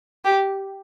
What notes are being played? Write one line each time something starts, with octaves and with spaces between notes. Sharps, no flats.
G4